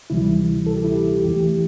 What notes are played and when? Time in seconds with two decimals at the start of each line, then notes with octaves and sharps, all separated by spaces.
0.10 D2 C3 E3 G3 E4
0.66 A4
0.76 G4
0.84 E4
0.93 G4
1.24 E2 E3 A3 G4